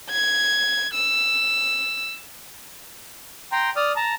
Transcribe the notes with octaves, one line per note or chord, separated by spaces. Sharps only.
G#6
E6
G5 A#5 C6
D5 D#6 F6
A5 A#5